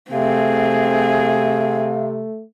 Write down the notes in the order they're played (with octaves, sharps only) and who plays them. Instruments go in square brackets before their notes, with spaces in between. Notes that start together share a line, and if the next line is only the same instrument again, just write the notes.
[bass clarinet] C3 [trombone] A3 [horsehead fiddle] C4 G#4 [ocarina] F5